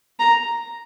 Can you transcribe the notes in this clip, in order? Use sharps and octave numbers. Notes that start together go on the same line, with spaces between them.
A#5